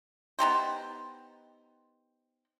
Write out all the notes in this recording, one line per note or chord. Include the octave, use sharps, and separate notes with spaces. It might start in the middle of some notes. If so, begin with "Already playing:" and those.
B3 D#4 G4 C5